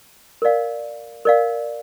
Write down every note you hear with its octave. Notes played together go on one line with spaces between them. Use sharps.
A#4 D5 F5
A#4 D5 F5